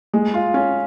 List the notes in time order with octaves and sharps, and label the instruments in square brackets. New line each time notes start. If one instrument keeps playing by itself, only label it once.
[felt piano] G#3
F4
C#4